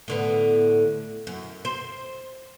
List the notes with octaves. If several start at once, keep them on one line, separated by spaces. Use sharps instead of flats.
A2 D3 B3
F#2
C5